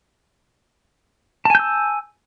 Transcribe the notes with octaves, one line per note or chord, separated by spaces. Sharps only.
G#5 A5 E6 G6